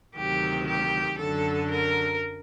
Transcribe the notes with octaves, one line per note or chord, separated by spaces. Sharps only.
D2 C3 D#3 F#3 G4
G4
F#2 D3 F#3 A4
A#4